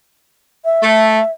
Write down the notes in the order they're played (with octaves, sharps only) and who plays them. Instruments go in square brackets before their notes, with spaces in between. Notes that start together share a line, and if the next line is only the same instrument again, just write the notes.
[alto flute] E5
[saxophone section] A3